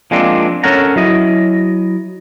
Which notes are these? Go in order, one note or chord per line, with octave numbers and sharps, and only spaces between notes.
F3 G#3 A#3 C4 D4
C#4 A4 A#4 C#5 F#5 A#5
F#3 E4 D#5